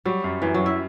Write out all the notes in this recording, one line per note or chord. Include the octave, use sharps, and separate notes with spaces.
F#3 G3
F#2
F#2 E3
F#3
F#2
E4